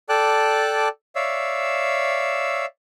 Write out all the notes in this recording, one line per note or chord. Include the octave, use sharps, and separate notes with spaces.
A4 D5 G5 A5 D6 F#6
C#5 D5 E5 F5 E6